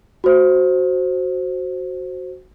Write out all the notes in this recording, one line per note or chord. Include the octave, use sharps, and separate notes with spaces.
F#4 C5